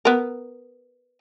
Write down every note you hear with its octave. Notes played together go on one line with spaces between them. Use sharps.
B3 A#4